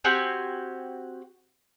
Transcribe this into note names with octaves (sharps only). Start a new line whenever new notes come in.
C4 F#4 G4 G#5